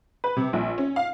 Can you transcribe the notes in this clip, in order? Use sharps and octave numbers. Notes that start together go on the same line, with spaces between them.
B4
C3
A#1
C#4
F5